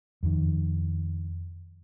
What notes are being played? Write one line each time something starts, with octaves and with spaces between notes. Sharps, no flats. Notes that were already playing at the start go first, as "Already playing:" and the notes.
F2 D#3